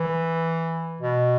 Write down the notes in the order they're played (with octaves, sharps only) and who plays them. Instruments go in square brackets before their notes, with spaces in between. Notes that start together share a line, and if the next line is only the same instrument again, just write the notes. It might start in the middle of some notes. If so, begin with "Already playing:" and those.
Already playing: [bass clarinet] E3
B2